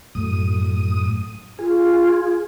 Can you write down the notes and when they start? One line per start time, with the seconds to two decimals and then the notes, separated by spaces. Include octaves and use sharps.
0.15 F#2 A2 D#6
1.59 F4 G#4